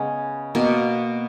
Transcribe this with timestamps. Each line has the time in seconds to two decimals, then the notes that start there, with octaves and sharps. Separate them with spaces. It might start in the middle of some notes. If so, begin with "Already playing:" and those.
Already playing: C#3 G#3 B3 C#4
0.55 B2 A#3